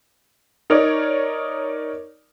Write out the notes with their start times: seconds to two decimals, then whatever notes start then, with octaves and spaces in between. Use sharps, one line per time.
0.70 D#4 A#4 C#5 D5